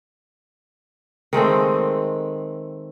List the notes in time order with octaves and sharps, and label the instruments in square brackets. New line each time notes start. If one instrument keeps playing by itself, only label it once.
[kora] D#3 G#3 A3 C4